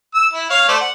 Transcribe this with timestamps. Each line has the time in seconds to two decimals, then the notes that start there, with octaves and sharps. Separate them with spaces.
0.15 E6
0.33 E4
0.50 C#5 F5
0.68 A3 C5 D5
0.81 F#5